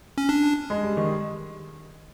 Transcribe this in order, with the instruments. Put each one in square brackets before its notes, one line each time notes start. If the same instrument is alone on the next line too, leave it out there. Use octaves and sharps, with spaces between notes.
[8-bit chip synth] C#4
D4
[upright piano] G#3
G3
D#3